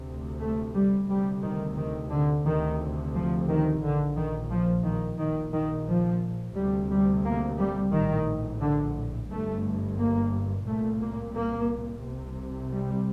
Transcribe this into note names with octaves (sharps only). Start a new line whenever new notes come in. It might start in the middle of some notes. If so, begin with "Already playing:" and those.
Already playing: D2 C3
A3
G3
D2 C3 G3
D#3
D#3
D3
D2 C3 D#3
F3
D#3
A#1 A#2 D3
D#3
F3
D#3
A#1 A#2 D#3
D#3
F3
D2 C3 G3
G3
A#3
G3
A#1 A2 D#3
D3
G1 G2 A3
A#3
C2 A#2 A3
A#3
A#3
C2 C3
G3